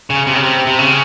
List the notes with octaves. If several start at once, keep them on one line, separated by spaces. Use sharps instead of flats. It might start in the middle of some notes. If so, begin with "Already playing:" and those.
C#3
C3
C#3
C3
C3
C#3